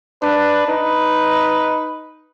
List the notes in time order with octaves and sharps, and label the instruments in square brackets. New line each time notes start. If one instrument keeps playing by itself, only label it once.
[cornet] D4 [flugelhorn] B4
[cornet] D#4 [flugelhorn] B4